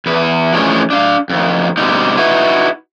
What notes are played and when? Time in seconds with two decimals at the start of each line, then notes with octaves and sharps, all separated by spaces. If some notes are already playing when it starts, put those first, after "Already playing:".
0.06 E2 B4
0.53 E3 F3 G#3 A3 C#4 D4
0.90 D4 F5
1.29 F2 D#3
1.77 B2 D3 G3 C4 D#4
2.17 D#4 E4 F#4 B4